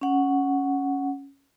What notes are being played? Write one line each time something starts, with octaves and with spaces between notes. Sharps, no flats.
C#4 F#5